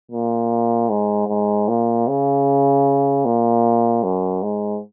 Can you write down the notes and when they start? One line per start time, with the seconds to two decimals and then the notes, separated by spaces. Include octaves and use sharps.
0.11 A#2
0.89 G#2
1.28 G#2
1.68 A#2
2.08 C#3
3.25 A#2
4.04 F#2
4.43 G#2